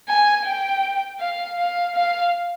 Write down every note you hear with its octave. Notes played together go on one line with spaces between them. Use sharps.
G#5
G5
F5
F5
F5